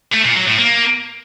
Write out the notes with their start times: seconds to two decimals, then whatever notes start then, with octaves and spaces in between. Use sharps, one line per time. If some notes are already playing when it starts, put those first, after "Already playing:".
0.13 A3
0.24 A#2
0.36 F#3
0.47 A2
0.59 A#3